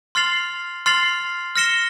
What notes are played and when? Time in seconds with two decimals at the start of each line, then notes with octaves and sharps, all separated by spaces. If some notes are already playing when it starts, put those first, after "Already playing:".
0.15 C6 F6 A6 C7 F7
0.86 C6 F6 A6 C7 F7
1.56 F6 A#6 C#7 E7 G7